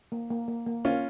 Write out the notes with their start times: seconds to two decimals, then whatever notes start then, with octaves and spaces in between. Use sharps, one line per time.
0.12 A#3
0.30 A#3
0.48 A#3
0.66 A#3
0.85 A#3 C#4 F4